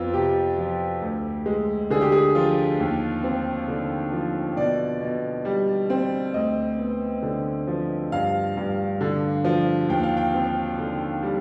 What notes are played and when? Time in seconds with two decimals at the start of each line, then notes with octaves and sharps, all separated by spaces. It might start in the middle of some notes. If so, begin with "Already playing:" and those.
Already playing: F2 B3 F4 C5
0.13 C3 G4
0.58 F3
1.02 D2
1.46 G#3
1.90 D3 G#4
2.01 G4
2.12 G#4
2.35 F3 F4
2.80 D#2
3.23 C4
3.68 D3
4.12 F3
4.56 B2 D5
5.01 B2
5.45 G3
5.90 C4
6.34 D2 D#5
6.78 B3
7.23 D3
7.67 F3
8.12 G2 F5
8.57 G2
9.01 D3
9.45 F3
9.89 D#2 G5
10.03 F5
10.17 G5
10.34 C4
10.79 D3
11.23 G3